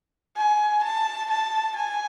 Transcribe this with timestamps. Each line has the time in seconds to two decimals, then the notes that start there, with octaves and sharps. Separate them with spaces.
0.37 G#5
0.83 A5
1.30 A5
1.76 G#5